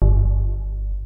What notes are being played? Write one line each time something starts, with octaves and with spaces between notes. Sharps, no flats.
G1